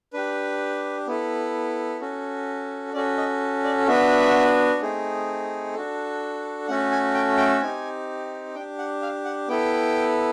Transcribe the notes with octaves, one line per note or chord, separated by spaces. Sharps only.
D4 G4 B4
B3 E4 A4
C#4 F#4 A4
C#4 F#4 A4 D5
D#5
D5
B3 D4 F#4 E5
A3 C4 D#4 G#4
D4 F#4 A4
A3 C#4 F#4 A4 F#5
G#5
G5
G5
C4 D#4 G4 G#5
D4 G4 G5
F#5
F5
F#5
B3 E4 A4 G5